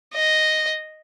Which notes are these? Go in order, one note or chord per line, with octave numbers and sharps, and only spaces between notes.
D#5